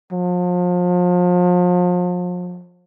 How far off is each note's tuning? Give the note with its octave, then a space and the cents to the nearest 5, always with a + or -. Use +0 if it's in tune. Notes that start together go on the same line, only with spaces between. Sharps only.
F3 +35